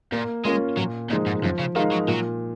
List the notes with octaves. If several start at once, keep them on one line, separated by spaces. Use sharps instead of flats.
A#2 A#3
G#3 C#4 F4 A#4
A#2 F#3
A#2 F3 G#3 D#4
G#2
F#2 F3
C#3
D#3 G#3 D#4 A#4 F5
F#3
A#2 F#3